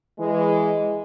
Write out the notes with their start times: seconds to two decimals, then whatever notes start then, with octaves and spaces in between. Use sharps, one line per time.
0.19 E3 G#3